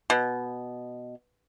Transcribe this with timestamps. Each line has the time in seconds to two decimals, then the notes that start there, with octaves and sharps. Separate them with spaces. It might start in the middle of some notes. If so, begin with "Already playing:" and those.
0.10 B2